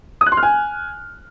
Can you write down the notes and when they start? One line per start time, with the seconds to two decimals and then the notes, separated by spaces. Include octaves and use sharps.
0.21 D#6
0.26 F#6
0.32 C6
0.37 F6
0.43 G#5